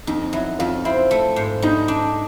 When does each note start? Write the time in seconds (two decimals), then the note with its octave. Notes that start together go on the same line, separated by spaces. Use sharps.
0.07 F2 D#4
0.33 F#3 E4
0.59 F2 F4
0.85 C4 E4
1.11 A3
1.36 G#2
1.62 G3 D#4
1.88 D4